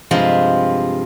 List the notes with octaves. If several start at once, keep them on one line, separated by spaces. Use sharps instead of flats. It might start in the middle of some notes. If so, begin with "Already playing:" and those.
G2 C3 F3 G#3 F4